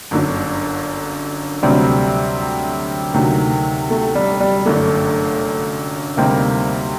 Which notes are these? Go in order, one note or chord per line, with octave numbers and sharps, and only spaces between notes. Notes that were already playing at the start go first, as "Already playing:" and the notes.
G1 F#2 D3
D2 C3 F#3 G3 C4
D2 C3 D#3 F#3
A3
G3
G3
G1 F#2 D3 A3
D2 C3 G3 A#3 C4 D#4